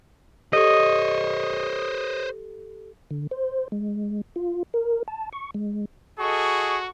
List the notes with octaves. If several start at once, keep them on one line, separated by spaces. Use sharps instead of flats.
G4 A4 C5 C#5 D#5
D3
C5
G#3
F4
A#4
A5
C#6
G#3
F#4 G#4 A4 D#5 C#6